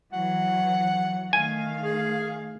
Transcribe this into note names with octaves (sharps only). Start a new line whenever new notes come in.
E3 F#3 F#5
D#3 A3 F5 G#5
G#4